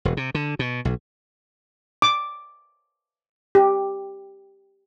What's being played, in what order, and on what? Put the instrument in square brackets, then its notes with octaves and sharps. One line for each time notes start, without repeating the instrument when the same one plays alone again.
[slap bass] E1
C3
D3
B2
B1
[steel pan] D6
G4